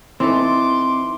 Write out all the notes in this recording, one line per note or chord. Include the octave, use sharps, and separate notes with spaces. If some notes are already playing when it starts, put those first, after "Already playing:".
E3 C4 D#4 A4 C6 D6